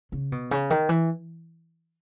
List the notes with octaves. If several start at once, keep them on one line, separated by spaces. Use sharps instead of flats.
C#3
B2
C#3
D#3
E3